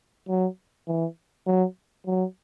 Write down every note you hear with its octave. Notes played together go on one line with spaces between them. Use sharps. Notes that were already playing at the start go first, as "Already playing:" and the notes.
F#3
E3
F#3
F#3